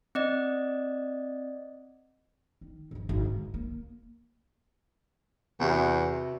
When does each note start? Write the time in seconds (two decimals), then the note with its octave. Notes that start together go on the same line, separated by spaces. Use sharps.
0.15 C4 D5 D#5
2.61 D#3
2.91 G#1 F2
3.09 G#1
3.25 G#3
3.54 A#3
5.60 E2 C3 F#4